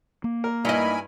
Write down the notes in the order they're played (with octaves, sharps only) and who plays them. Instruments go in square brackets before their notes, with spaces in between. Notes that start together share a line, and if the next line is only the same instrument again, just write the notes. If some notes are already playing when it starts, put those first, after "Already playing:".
[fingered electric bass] A#3
[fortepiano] A#4
[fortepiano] G2 E4 F6 [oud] D#4 D#5 [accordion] A#4 G#5 B5